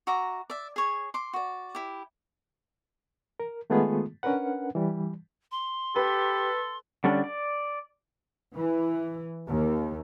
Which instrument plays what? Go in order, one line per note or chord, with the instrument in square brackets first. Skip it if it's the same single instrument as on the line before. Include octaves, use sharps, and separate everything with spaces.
[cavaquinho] F#4 E5 A#5 D6
D5 E5
G#4 C#5
C6 D6
F#4 D5
E4 G4
[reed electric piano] A#4
D#3 G#3 A3 B3 F4 G#4
C#4 D4 A#4 B4 F#5
E3 G3
[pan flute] C6
[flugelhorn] G4 [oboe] A4 [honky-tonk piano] B4
[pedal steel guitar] D3 G3 C#4 D4
D5
[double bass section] E3
D#2